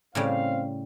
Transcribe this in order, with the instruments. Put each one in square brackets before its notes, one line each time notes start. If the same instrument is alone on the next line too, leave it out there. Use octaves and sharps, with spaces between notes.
[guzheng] A2 C#3 G3 [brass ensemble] C4 F5